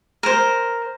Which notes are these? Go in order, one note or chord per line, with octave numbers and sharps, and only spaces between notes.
A#4 C5